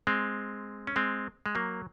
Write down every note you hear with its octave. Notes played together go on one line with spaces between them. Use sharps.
G#3 C4
C#4
G#3 C4
G#3
F#3 A#3